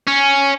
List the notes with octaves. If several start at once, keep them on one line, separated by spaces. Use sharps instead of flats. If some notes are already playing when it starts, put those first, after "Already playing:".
C#4